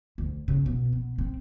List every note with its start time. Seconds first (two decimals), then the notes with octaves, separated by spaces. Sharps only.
0.18 D2
0.48 C#3
0.66 B2
0.93 B3
1.18 C4